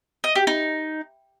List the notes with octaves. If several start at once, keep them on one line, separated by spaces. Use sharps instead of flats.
D#5
G4
D#4